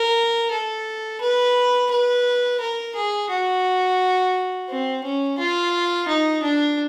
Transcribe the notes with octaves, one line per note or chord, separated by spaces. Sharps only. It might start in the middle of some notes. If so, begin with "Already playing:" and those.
Already playing: A#4
A4
B4
B4
A#4
G#4
F#4
C4
C#4
F4
D#4
D4